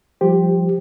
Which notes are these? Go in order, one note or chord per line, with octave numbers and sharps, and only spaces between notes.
F3 G3 G4 C5